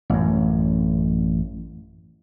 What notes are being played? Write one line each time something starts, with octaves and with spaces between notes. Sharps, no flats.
A1 F#2